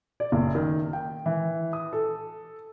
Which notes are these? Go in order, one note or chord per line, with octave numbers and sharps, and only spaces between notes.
D5
F#1
D#3
G5
E3
D#6
A4